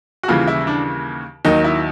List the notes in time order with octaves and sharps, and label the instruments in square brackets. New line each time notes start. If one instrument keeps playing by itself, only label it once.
[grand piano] F#4
D#2 C#3 E3 G3 F4
E4
D4
D#2 D#3 F#3 D#4
E4